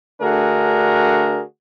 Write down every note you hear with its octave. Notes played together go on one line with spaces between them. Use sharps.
D3 A3 D4 F#4 G#4 A#4